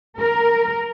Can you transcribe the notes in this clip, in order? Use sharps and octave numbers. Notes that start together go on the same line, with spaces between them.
A#4